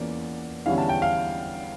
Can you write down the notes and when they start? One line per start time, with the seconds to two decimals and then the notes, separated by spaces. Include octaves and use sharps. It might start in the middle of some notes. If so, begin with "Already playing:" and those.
Already playing: E2 E3 A#3 C#4 F4 D5
0.66 E2 D3 G3 C#4 E4 F5
0.78 A5
0.89 G5
1.02 F5